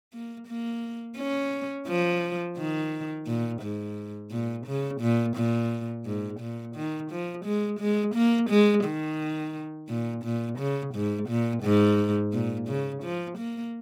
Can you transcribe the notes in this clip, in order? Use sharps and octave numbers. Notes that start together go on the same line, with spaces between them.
A#3
A#3
C#4
F3
D#3
A#2
G#2
A#2
C#3
A#2
A#2
G#2
A#2
D#3
F3
G#3
G#3
A#3
G#3
D#3
A#2
A#2
C#3
G#2
A#2
G#2
A#2
C#3
F3
A#3